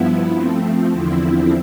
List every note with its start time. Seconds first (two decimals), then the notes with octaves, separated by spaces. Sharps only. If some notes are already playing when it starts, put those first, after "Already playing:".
Already playing: G2 F3 B3 E4
0.33 F3 A3 C4
0.91 E2 D3 F3 C4 E4